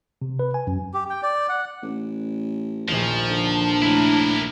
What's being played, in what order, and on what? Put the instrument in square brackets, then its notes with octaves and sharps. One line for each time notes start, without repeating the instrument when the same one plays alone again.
[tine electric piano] C3
B4
G#5
F#2
[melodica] G4
G5
D5
F#5
[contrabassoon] A1
[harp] A#1 D#2 [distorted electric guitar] F3
[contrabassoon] D3 [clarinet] D4
[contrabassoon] A2 [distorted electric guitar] E4 A#4